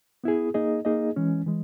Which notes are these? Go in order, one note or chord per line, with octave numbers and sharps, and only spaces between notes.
B3 E4 G#4
A#3 D#4 G#4 D#5
A#3 D#4 G#4 D#5
E3 G#3 C#4
E3 G#3